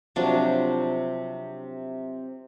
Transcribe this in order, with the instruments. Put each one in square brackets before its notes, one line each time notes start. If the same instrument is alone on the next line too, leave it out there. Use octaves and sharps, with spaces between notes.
[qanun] C3 F3 F#3 D4